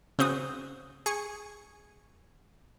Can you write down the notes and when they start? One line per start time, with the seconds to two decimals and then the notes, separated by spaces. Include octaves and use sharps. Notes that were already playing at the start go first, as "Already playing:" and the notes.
0.19 C#3 C4 F#4 D#6
1.06 G#4 C#6